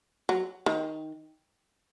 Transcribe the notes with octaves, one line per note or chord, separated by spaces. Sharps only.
F#3
D#3